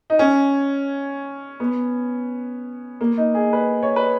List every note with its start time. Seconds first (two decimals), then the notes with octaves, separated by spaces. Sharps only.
0.10 D#4
0.19 C#4
1.60 B3
3.01 A#3
3.17 D#4
3.34 G#4
3.53 B4
3.83 C#5
3.96 B4